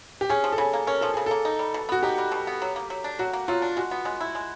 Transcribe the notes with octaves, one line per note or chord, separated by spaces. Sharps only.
G4
C#4 G#4
F3
A4
C#3 G#4
A#3
C#4 A#4
F3 A4
C#3 G#4
A#3 A4
D#4
G3
B2
B3 F#4
D#4 G4
G3
B2
B3
F#3
A#3
F#3
D4
F#3 F#4
A#3
F#3 F4
D4
G#3 F#4
B3
G#3
E4
G#3